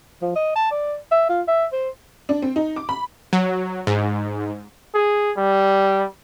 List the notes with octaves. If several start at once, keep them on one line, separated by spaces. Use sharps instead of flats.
F3
D#5
A5
D5
E5
F4
E5
C5
D4
C4
D#4
D6
B5
F#3
G#2
G#4
G3